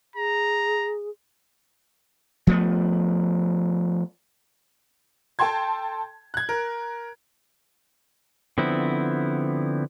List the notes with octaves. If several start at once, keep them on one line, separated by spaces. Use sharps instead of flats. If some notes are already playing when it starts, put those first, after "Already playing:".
G#4 A#5
F3 A3 B3
A4 G5 A5 C6 G#6
F#6 G#6
A#4
D3 F3 B3 C4 E4